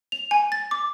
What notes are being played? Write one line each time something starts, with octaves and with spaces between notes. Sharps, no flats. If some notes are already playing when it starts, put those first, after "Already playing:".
F7
G#5
A6
D6